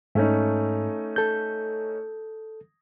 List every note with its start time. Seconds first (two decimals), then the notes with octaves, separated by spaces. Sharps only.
0.15 G#2 A3 C#4 D#4
1.16 A4 G6